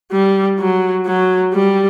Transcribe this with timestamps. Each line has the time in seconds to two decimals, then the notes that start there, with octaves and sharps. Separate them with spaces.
0.12 G3
0.59 F#3
1.06 F#3
1.53 G3